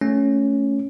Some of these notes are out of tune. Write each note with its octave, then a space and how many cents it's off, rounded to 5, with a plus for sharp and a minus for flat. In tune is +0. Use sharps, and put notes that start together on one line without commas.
A3 +0 C#4 +0